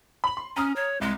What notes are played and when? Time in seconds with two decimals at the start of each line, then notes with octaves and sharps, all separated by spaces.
0.24 B5 F#7
0.37 C6
0.57 C#4 A#5 D#6 F6
0.76 C#5
1.01 C2 G#3